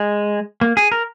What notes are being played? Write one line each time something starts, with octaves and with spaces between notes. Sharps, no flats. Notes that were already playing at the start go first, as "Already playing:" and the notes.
Already playing: G#3
A#3
G#4
A#4